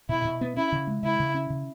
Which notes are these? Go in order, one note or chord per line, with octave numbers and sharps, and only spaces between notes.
B2 E4
B2
B3
C#4 E4
C#3
G#3
C#3 E4
C#3
C#4
C#3